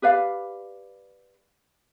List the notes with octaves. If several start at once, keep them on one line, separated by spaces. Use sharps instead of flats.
G4 B4 D5 F5